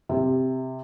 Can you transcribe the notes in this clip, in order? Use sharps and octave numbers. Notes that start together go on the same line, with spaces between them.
C3